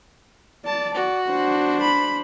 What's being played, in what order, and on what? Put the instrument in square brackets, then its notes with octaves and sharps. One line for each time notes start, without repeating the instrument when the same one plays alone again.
[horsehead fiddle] D5 [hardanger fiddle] A5
[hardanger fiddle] F#4
[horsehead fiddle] D4 C5
[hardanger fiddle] B5